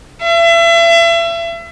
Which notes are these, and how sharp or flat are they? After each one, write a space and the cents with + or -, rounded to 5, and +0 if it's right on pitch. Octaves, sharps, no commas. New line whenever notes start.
E5 +35